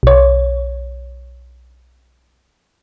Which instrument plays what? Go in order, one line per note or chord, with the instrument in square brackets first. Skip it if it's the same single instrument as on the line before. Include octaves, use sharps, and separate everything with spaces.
[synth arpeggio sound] B1 C#5